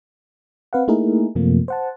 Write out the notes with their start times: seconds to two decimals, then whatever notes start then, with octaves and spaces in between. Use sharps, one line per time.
0.73 C4 B4 F5 F#5
0.88 A3 A#3 D#4 E4 G#4 A#4
1.35 F#2 C3 F3 A3 A#3
1.68 C5 F#5 A5